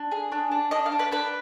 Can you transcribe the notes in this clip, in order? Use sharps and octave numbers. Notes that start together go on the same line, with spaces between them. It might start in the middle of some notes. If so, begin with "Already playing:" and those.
Already playing: D4
G#4
D4
D4
D4 D#5
F5
D4
B4
D4 B4